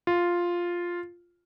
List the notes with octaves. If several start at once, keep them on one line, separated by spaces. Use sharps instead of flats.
F4